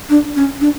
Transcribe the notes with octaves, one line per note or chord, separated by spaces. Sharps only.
D4
C#4
D4